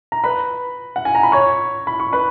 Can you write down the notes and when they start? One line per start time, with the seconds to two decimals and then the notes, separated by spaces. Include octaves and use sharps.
0.12 A#5
0.24 B4 B5
0.96 F#5
1.05 G#5
1.15 A#5
1.23 B5
1.32 C#5 C#6
1.87 B5
2.00 C#6
2.13 B4 B5